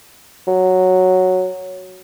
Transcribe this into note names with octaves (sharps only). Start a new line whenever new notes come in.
F#3